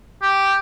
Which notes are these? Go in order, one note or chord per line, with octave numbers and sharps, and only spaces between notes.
G4